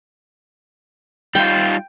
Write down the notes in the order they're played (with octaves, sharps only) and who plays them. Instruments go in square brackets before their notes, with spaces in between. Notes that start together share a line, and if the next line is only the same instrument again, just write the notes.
[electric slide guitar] G3 D#4 F4 [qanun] G5